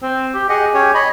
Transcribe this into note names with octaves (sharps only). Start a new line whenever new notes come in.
C4
G4
G4 G#4 D#5 F#5
C#4 G4 C#5
C#5 D#5 B5